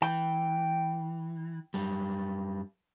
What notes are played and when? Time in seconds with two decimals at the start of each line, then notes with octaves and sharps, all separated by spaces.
0.02 E3 G5
1.74 F#2 G3